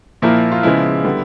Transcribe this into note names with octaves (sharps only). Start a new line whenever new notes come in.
A#2 F3 A#3 E4
F4
C#3 F3 G#3 B3 E4
D3 G3 B3